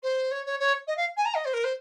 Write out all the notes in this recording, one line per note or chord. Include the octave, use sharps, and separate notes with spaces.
C5
C#5
C#5
C#5
D#5
F5
G#5
A#5
D#5
C5
A#4
C5